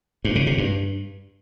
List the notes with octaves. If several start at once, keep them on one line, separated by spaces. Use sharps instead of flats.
G2
C#3
C3
G2